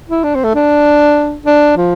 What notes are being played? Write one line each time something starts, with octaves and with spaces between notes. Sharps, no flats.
E4
D4
C4
A3
D4
D4
F3